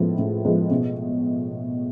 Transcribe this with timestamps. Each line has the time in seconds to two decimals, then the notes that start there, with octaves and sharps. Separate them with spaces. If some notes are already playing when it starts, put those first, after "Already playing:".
Already playing: A2 F3 G#3 B3
0.18 A2
0.45 F3 G#3 B3
0.71 B2